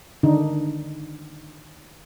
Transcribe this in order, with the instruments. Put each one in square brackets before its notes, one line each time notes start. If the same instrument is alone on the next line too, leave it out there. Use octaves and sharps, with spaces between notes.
[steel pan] D3 D#3 D4 D#4